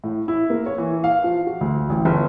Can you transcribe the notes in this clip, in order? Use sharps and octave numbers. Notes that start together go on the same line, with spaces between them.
A2
E4
A#3
C#5
E3
F5
F3
F#4
D2
A1
G1